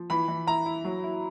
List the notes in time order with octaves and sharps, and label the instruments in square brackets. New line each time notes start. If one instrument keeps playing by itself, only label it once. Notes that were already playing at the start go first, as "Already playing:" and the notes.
Already playing: [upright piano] F3
[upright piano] E3 [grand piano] B5
[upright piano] E3
[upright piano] E4 [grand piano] A#5
[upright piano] E4
F#3
E4